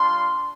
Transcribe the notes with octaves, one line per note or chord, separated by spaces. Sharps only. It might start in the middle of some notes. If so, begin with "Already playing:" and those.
Already playing: G3 D4 F4 C6